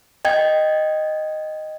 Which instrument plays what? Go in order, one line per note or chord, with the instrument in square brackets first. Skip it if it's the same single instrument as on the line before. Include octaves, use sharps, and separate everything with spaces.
[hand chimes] D#5 G5 G#6